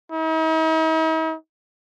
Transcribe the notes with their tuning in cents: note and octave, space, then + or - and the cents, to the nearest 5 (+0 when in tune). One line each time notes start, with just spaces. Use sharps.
D#4 +45